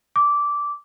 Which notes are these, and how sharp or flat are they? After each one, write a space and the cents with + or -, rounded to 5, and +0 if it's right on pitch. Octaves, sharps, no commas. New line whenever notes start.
D6 -10